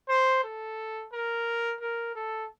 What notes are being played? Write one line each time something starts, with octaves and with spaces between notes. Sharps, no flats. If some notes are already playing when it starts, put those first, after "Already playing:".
C5
A4
A#4
A#4
A4